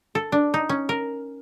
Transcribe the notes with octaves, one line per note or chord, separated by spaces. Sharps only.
A4
D4
D#4
C#4
A#4